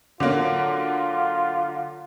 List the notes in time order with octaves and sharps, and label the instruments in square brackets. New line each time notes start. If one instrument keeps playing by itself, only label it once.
[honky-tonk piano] D3 F#3 A#3 [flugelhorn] F4